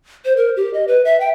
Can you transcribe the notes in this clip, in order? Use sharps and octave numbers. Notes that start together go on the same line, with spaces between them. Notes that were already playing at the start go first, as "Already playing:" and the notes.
C5
A#4
G4
D#5
B4
E5
G5